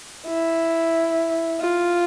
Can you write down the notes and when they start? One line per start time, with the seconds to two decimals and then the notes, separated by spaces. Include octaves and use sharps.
0.27 E4
1.61 F4